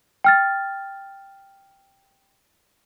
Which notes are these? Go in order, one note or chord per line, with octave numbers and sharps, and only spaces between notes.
G5 F6 A6